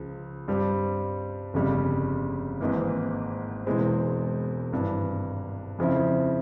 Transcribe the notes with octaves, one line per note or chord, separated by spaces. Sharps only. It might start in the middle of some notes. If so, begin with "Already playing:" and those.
Already playing: C#2 C#3 F3
G2 G3 C4
G1 F2 C#3 G3
G#1 G#2 E3 A#3
E1 E2 E3 G#3 C4
G#1 G2 E3
F2 C#3 F3 C4 E4